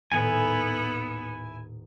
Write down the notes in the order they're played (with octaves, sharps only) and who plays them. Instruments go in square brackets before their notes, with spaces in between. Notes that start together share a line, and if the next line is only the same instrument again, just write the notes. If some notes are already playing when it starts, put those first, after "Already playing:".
[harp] D#1 A2 D#6 [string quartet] B3 [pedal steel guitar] E4 G#5